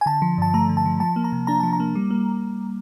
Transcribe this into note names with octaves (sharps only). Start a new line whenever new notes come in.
G#5
D3 A5
F3
G2 A5
A3 A#5
D3
A5
F3
F3 A5
A#3
A#5
C3
D4 A#5
F3 A5
A#5
A#3
G3
A#3